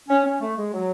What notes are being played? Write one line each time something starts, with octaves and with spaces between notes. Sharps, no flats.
C#4
C#4
A3
G#3
F#3